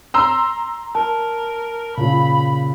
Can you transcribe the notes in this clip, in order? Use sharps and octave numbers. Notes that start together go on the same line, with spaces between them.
A#5 C6 E6
A#4 A5
A#2 C#3 B5